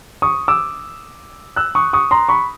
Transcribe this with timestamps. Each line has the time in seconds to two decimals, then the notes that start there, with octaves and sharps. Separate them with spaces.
0.22 C#6 D#6
0.48 D6 E6
1.56 E6 F#6
1.75 C#6 D#6
1.93 C#6 D#6
2.11 A#5 C6
2.29 B5 C#6